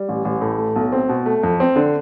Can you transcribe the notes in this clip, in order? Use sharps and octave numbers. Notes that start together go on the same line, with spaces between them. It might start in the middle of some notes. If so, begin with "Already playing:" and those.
Already playing: G3
A1
A1
A2
A3
B1
C4
B2
A3
F2
C4
D3